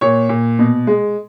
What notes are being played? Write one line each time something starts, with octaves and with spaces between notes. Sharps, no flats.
A#2 C#5
A#2
B2
G#3